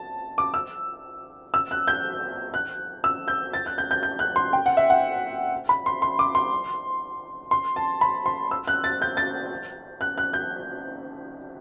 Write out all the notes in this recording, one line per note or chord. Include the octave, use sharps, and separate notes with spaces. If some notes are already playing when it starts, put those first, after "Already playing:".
Already playing: A5
D6
E6
E6
F#6
G6
F#6
E6
G6
A6
F#6
G6
G6
G6
F#6
C6
G5
F#5
E5
F#5
B5
C6
C6
D6
C6
C6
A5
B5
C6
E6
F#6
A6
G6
A6
F#6
F#6
G6